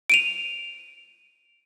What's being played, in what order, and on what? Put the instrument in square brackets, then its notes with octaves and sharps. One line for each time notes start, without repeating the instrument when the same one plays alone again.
[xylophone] D7 D#7 F7